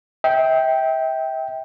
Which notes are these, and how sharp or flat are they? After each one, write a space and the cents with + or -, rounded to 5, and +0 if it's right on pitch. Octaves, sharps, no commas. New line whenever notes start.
E5 -35 G5 +0